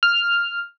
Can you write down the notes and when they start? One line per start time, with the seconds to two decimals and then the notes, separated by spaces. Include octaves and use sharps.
0.03 F6